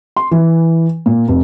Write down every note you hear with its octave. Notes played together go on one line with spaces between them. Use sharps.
C6
E3
A#2
F1